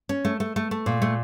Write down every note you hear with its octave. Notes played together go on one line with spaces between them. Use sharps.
C#4
A3
A3
A3
A3
A#2
A3